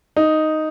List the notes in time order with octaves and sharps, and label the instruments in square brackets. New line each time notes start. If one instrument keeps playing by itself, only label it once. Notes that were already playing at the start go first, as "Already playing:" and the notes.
[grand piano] D#4